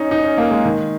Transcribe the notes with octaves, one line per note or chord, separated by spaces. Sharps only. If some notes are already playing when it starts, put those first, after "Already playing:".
Already playing: C#4 D#4
D#4
C#4
A#3
G#3
D#3